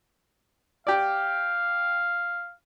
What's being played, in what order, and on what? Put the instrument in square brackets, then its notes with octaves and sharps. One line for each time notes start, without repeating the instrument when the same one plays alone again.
[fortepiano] G4 D5 [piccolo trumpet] F5